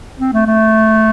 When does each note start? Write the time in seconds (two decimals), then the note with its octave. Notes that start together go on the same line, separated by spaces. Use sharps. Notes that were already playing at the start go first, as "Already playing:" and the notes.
0.20 C4
0.33 A3
0.47 A3